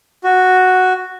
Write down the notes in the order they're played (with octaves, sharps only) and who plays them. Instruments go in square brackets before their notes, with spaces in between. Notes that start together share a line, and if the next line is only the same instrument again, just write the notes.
[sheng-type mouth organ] F#4